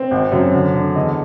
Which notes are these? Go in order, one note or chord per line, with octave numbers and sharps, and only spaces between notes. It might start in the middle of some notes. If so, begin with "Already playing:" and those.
Already playing: C4
G#1
F#2
D3
D3
E2 D#5